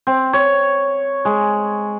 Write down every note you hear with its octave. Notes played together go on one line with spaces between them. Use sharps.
C4
C#5
G#3